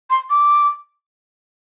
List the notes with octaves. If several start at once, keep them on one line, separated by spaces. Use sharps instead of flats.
C6
D6